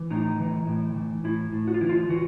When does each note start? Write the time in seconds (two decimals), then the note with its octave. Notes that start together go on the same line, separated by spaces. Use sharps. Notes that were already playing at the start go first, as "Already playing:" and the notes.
Already playing: E3
0.10 A2 D#4
0.40 E3
0.67 A2
0.96 E3
1.24 A2 E4
1.53 A2
1.68 F#4
1.74 F4
1.81 E3 E4
1.89 F4
2.09 E3 F#4